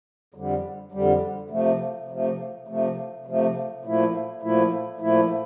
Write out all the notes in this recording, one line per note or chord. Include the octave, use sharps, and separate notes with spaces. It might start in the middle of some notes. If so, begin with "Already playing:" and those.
F2 D3 G3
F2 D3 G3
C3 F3 A3
C3 F3 A3
C3 F3 A3
C3 F3 A3
A#2 F3 A3 E4
A#2 F3 A3 E4
A#2 F3 A3 E4